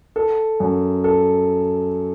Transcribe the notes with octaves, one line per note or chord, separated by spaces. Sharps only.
A4
F#2
A4